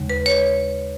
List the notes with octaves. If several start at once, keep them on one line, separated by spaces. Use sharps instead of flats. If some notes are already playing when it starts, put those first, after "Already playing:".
Already playing: D#2 C#3 G#3
B4
C#5